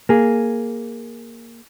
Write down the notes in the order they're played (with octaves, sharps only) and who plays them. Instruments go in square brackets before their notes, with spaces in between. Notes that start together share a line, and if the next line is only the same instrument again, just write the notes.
[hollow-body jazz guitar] A#3 G#4